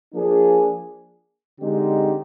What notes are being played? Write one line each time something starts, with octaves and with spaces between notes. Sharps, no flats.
F3 A#3 D4 G#4
D3 G#3 C4 D#4 G4